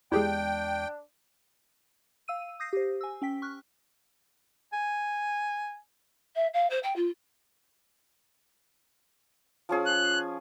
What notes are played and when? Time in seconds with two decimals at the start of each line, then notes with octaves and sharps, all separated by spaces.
0.12 E2 G#3 D4 E4 G4 G#4 G5
2.28 F5 E6 D#7
2.60 D#6 G6 A#6 C7
2.73 G4 C5
3.01 G#5 E6
3.22 C#4 G5 B6
3.42 C#6 F6 F#6
4.73 G#5
6.35 E5
6.53 F5
6.70 C5
6.83 G5
6.95 F4
9.69 F3 C#4 G#4
9.86 F#6